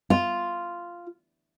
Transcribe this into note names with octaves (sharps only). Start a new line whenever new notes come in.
F4